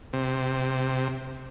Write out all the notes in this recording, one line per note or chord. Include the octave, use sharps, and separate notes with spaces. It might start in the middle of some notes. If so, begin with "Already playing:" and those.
C3